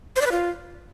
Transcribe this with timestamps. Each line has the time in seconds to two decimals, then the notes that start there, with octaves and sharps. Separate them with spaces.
0.16 C5
0.21 D5
0.26 B4
0.32 F4